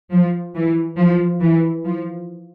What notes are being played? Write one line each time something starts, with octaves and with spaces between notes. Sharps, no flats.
F3
E3
F3
E3
F3